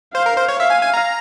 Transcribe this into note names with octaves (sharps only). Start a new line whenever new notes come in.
C5 F5
A#4
C5
C#5
E5 F5
G#5
G#5
A#5